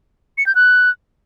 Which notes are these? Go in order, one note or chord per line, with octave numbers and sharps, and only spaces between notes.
C#7
G6
F#6